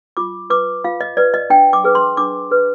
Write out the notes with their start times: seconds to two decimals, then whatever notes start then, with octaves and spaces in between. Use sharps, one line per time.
0.17 F4 D6
0.50 B4 D6
0.84 F4 F5
1.01 D#5
1.17 B4 D5
1.34 D#5
1.50 D4 G5
1.73 D6
1.84 G#4 B4
1.95 C6
2.17 D4 D6
2.51 G#4 B4